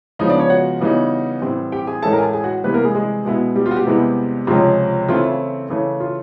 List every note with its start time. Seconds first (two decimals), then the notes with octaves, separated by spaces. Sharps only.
0.19 C#3 F3 G#3 B3 D#4 D#5
0.29 D4 D5
0.39 C#4 C#5
0.50 F#4 F#5
0.81 C#3 E3 G3 B3 D#4
1.42 A2 E3 G3 C4
1.72 G4 G5
1.87 G#4 G#5
2.02 A2 E3 G#3 C#4 E4 A4 A5
2.13 A#4 A#5
2.18 G#5
2.23 A4 A5
2.33 G#4 G#5
2.44 F#4 F#5
2.64 C3 E3 G3 B3 B4
2.74 A#3 A#4
2.85 G#3 G#4
2.95 G#3 G#4
3.25 B2 G#3 B3 E4
3.56 G3 G4
3.66 F4
3.71 F#4
3.76 G3 G4
3.86 E2 C3 E3 G#3 B3
4.47 C#2 C3 F3 G#3 C#4 F4
5.08 C#3 E3 A3 C4 F4
5.24 E4
5.70 C#3 E3 A3
6.00 F4